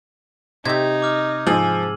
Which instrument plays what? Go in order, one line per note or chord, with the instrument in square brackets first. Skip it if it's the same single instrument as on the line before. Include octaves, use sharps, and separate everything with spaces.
[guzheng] C3 G4 [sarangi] D#4 [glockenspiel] G#6
[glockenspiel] D6 F6
[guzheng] G#2 G#4 [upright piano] F3 [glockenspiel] E6 D#7 F#7